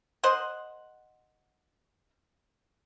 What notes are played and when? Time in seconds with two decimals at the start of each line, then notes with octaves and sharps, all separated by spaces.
0.23 A#4 C5 D#5 F#5